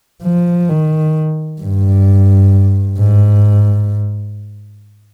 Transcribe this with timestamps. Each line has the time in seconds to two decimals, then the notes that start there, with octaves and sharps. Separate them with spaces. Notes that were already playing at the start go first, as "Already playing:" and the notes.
0.23 F3
0.69 D#3
1.62 G2
2.99 G#2